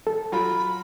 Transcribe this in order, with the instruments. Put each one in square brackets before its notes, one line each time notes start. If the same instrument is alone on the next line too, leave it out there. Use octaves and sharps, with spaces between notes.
[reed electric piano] A4
[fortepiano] F#3 F4 [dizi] B5